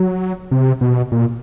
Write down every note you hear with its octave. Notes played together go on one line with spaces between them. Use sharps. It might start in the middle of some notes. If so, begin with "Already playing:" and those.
Already playing: F#3
C3
B2
A#2